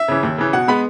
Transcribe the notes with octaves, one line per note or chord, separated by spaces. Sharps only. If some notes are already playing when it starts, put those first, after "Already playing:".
Already playing: E5
C#3 E3
D#2
C#3 E3
B2 F#5
G#3 B3 B5